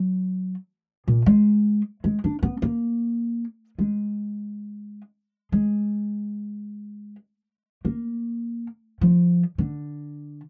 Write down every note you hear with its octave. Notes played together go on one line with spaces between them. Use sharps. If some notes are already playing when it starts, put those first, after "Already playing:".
Already playing: F#3
A#2
G#3
G#3
D4
B3
A#3
G#3
G#3
A#3
F3
D3